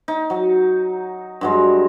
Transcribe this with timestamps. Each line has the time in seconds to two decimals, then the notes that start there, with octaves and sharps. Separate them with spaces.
0.08 D#4
0.30 F#3
1.41 G2 F#3 G#3